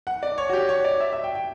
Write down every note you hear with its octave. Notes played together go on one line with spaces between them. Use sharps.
F#5
D5
C#5
F#4
G4
C#5
D5
E5
E5
G5
G5